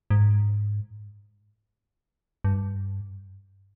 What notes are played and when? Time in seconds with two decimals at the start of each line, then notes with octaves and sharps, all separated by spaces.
0.10 G#2
2.44 G2